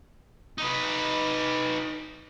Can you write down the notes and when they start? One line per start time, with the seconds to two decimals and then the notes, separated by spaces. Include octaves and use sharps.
0.58 D#4 B4